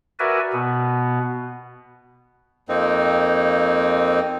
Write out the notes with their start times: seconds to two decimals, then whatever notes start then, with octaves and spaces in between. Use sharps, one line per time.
0.19 F#4 A#4 B4 D5 E5 G#5
0.53 B2 B3
2.69 F2 A#3 C4 D#4